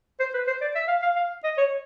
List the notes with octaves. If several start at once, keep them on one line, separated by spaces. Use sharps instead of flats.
C5
B4
C5
D5
E5
F5
F5
F5
D#5
C#5